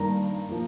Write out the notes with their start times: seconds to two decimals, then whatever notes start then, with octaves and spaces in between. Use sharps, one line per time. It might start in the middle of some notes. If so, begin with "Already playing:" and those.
Already playing: G2 D#3 A#3 A#5
0.49 F3 A#3